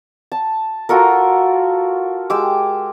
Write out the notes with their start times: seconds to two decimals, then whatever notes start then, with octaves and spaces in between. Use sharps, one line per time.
0.32 A5
0.89 F4 F#4 A4 A#4
2.30 G#3 G4 D6 E6